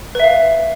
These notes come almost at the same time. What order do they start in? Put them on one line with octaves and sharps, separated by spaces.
B4 E5 F5